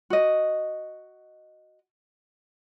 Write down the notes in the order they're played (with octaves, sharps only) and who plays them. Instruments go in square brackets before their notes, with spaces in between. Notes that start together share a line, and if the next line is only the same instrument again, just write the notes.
[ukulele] F#4 D#5